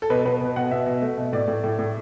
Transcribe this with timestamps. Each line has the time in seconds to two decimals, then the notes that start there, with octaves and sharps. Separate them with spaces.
0.02 A4
0.10 B2 B4
0.25 B2 B4
0.41 B2
0.56 B2 F#5
0.71 B2 E5
0.86 B2
1.02 A3
1.17 B2
1.33 A2 D5
1.48 A2
1.64 A2
1.79 A2